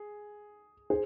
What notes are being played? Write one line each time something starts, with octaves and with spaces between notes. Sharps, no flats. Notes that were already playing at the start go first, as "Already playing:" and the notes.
Already playing: G#4
G#4 C5